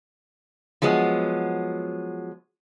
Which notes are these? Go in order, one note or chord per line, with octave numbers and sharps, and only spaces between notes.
F3 F#3 G#3 B3